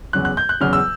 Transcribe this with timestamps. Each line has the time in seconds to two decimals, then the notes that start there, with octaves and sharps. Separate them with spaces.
0.13 E2 C#3 F#3 F#6
0.25 F#6
0.37 G6
0.49 F#6
0.61 E2 C#3 F#3 F6
0.73 E6